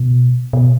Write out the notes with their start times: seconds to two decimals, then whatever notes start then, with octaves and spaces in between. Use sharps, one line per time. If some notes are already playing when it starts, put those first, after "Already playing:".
Already playing: B2
0.53 B2